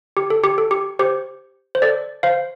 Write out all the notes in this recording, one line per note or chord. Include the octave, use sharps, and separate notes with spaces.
G4
A4
G4
A4
G4
G4 C5
C5
A4 D5
C5 F5